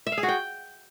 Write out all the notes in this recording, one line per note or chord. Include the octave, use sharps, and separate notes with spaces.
E5
F5
G#4
F#4
G5